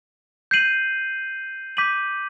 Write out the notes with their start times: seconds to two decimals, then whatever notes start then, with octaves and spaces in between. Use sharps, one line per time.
0.51 G6 C7 D#7 F#7
1.77 D6 G6 B6 D#7 F#7